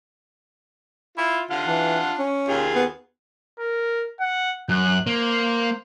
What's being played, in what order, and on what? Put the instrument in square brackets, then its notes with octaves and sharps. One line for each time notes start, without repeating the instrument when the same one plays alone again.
[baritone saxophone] E4 [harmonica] F4
[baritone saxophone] D3 [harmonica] F4 F#5
[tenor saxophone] E3 [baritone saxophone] D4
[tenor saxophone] C#4
[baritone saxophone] D#2 [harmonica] F4 G#4
[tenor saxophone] B3
[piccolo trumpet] A#4
F#5
[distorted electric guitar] F#2 [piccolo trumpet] F#6
[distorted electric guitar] A#3 [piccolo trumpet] C5